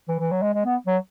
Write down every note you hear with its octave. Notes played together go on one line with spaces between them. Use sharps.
E3
E3
F#3
G#3
G#3
B3
F#3